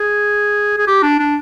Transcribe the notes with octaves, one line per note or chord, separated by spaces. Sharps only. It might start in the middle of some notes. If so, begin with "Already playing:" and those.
Already playing: G#4
G#4
G4
D4
D4